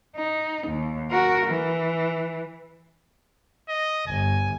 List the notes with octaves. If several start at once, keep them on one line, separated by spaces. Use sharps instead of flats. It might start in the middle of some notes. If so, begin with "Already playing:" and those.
D#4
D#2
F#4 A#4
E3
D#5
G1 G#5